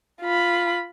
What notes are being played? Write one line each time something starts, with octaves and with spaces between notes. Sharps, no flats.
F4 B5